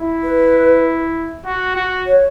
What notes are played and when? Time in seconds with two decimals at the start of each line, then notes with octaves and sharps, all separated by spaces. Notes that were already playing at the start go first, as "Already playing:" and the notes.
Already playing: E4
0.24 B4
1.45 F#4
1.75 F#4
2.07 C#5